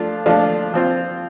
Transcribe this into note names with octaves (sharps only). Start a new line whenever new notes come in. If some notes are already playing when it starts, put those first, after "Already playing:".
Already playing: F3 A3 D4 F4
F3 A3 D4 F4
F3 C4 F4